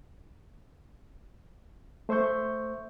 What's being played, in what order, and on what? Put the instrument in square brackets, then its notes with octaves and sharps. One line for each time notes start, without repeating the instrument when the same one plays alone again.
[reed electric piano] A3 C5 E5 C#6 G6